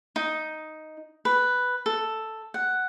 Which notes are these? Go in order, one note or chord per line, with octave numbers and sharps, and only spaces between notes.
D#4
B4
A4
F#5